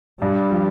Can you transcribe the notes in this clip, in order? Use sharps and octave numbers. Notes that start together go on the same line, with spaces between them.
G2 G3
F3